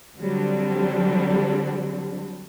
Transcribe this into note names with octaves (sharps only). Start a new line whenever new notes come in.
D3 F#3 G3 C4 D4